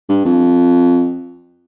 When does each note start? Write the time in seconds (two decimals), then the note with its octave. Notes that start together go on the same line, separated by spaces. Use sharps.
0.09 G2
0.25 F2